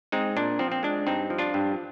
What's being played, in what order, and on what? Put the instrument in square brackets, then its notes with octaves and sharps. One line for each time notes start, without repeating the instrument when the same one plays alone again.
[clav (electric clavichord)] G#3 C4 D#4
A#2 D4
F3 C4
C4
G#3 D4
G2 C4 D#4
F3
D4 F4
G2